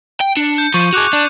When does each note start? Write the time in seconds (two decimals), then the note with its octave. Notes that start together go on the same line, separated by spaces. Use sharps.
0.20 G5
0.37 D4 C#7
0.58 G6
0.74 F3 C#6
0.93 F#4 G#4 D6 F#6 F7
1.13 D4